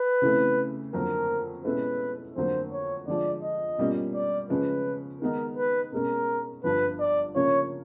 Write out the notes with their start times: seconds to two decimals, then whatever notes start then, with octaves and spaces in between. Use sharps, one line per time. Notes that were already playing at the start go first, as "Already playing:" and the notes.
Already playing: B4
0.22 C#3 E3 A3 C4
0.93 F2 D3 F#3 A#3 A#4
1.65 B2 G#3 C#4 E4 A4 B4
2.36 F2 D3 F#3 A#3 C5
2.72 C#5
3.08 D3 F3 G#3 D5
3.43 D#5
3.78 B2 G3 A#3 C#4 F4
4.14 D5
4.50 C#3 F3 G#3 C#4 B4
5.21 D#3 G#3 B3 D#4 A#4
5.57 B4
5.92 B2 G#3 C#4 A#4
6.64 G1 G2 D3 F3 B4
6.99 D5
7.35 C#3 F3 A#3 C#4 F4 C#5